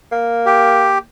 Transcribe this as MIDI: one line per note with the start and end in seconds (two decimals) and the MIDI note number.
0.12 1.03 58
0.46 0.98 67